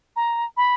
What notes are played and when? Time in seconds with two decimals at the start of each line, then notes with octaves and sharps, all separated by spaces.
0.16 A#5
0.57 B5